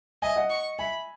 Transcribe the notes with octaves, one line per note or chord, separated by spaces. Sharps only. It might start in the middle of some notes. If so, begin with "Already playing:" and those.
D#5 E5 G#5
D#5 F#5
C#6
E5 G#5 B5